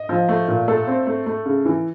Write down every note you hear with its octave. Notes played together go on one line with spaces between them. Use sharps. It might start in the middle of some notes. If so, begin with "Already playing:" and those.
Already playing: D#5
F3
A3
A#2
A3 A4
C4
A3
A3
C#3
E3